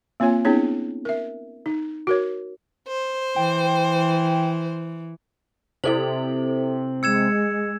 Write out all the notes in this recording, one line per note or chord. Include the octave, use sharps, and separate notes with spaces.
A#3 C4 F4 C#5 G#5
B3 C4 D4 E4 G#4 C#5
A#4 E5
D#4
F#4 A#4 C#5
C5
E3 G5
C3 E4 A4 C5 F#7
G#3 E6 G#6 C#7 E7